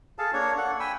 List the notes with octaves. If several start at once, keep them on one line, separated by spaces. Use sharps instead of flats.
G#4 A4 F5 A5
A#3 D4 C#5 C#6
A4 F#5
G5 G#5 B5 E6